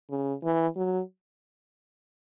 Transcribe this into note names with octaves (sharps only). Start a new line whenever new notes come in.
C#3
E3
F#3